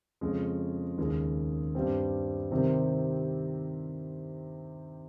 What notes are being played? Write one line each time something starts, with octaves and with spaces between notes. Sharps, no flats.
F2 C#3 G#3
D#2 C#3 G#3
G2 G3 C4
C3 D#3 G3 C4